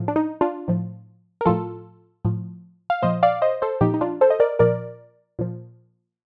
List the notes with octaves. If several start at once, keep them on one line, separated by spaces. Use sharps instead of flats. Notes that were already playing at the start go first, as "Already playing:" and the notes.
Already playing: A2 F3
D4
D#4
D4 F4
A2 F3
A#4
A2 F3 F4 A4
A2 F3
F5
A#2 F3 C5 D#5
D5 F5
C5 D#5
A4 C5
A#2 F3 D#4 G4
D#4
D4 F4
A4 C5
D#5
A#4 D5
A#2 F3 A#4 D5
A#2 F3